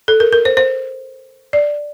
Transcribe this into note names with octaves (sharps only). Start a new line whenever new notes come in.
A4
A#4
A#4
C5
C5
D5